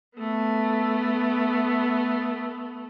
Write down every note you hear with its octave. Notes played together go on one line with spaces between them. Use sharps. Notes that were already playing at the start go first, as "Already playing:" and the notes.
A3 B3